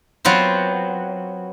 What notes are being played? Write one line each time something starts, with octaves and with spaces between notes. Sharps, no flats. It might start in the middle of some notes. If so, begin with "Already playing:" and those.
F#3 B3 C4 F4 C5